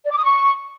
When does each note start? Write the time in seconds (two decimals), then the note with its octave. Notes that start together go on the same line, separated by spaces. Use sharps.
0.05 D5
0.11 D6
0.17 D#6
0.23 C#6